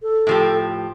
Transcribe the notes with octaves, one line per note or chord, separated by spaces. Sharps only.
A4
A2 F3 G4